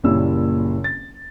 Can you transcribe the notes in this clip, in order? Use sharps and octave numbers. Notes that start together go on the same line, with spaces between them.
F#1 A#2 G3 C#4 E4 E6
A6